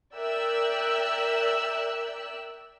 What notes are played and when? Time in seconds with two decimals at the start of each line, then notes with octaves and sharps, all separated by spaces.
0.16 A#4 D5 E5 G5 E6 F#6